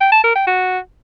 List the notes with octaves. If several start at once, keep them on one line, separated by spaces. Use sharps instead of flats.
G5
A5
A#4
G5
F#4